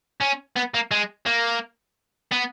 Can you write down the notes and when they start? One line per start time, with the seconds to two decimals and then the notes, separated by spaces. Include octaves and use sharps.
0.20 C#4
0.56 B3
0.74 A#3
0.91 G#3
1.26 A#3
2.31 B3